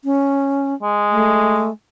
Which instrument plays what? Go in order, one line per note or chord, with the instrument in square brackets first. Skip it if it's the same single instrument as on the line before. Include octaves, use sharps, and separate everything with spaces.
[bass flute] C#4
[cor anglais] G#3
[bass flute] A3